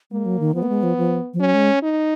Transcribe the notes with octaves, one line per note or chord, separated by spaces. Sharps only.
G#3 A#3
F#3
D#3
F3 B3
A#3
G#3
F3
F3
F3
F#3 C#4
G#3
D#4